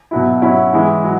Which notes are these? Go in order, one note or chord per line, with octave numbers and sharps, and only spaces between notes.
B2 F#3 E4
F#3 C#4 E4
E3 G#3 E4
F#3